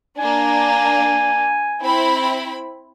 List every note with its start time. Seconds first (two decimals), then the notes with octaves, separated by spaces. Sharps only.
0.19 A#3 D4 G#5
1.82 C4 E4 B5